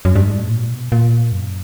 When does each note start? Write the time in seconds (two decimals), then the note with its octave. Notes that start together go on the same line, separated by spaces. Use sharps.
0.05 F#2
0.16 G2
0.27 G#2
0.38 A2
0.50 A#2
0.70 B2
0.92 A#2
1.32 F#2